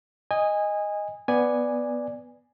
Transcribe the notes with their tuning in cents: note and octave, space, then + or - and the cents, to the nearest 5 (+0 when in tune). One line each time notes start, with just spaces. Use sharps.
D#5 +0 G#5 -20
B3 +0 D5 +0 G#5 -5